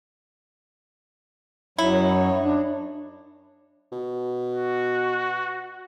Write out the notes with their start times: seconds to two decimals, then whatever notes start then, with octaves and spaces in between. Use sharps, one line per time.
1.78 F#2 F#3 D#4 E4 C#5
2.42 D4
3.92 B2
4.55 F#4